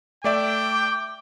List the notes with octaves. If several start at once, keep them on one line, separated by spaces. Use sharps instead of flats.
A3 D5 E5 G5 D6